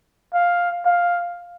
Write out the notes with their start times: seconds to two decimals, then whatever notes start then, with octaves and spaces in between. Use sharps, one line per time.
0.34 F5
0.86 F5